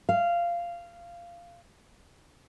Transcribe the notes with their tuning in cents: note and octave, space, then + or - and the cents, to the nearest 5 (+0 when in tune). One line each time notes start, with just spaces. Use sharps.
F5 -15